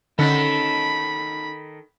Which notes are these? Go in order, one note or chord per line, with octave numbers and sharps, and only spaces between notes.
D3 D#3 C#4 D#4 A4 B5